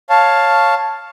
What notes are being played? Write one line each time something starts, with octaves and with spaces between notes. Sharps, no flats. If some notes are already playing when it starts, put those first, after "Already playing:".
C#5 F5 A5